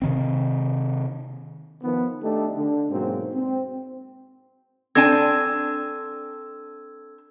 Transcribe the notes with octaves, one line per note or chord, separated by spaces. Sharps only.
C3 D#3 C4
D#3 F3 B3
A3 D4 D#4 G4 A4
D3
G#2 B2 F#3 A#3 C4
C4
C4 D4 A4 G#5 E6 G#6